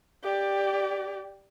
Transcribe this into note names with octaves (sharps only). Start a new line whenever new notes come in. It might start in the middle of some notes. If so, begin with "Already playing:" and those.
G4 D5